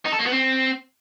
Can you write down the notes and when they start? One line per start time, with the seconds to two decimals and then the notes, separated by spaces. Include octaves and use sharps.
0.05 D#4
0.12 A4
0.19 A#3
0.26 B3
0.33 C4